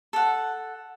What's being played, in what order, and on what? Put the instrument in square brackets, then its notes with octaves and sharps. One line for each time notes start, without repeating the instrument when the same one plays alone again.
[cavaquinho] A4 F#5